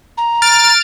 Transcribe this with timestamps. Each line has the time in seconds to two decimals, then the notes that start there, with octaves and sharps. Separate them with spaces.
0.17 A#5
0.42 F6 A6 D7